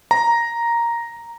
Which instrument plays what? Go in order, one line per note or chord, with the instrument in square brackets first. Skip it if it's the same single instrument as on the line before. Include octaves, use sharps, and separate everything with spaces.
[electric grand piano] A#5